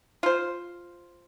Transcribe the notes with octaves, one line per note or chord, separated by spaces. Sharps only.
F4 C5